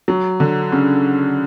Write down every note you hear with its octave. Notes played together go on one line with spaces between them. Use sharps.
F#3
D3
C#3